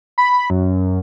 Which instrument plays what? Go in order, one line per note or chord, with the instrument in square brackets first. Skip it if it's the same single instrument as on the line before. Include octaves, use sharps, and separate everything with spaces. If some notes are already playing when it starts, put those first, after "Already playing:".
[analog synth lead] B5
F#2